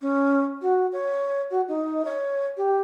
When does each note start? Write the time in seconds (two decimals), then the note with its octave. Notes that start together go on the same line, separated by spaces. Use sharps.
0.01 C#4
0.61 F#4
0.92 C#5
1.50 F#4
1.68 D#4
2.05 C#5
2.57 G4